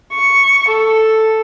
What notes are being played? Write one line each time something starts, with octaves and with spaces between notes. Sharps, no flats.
C#6
A4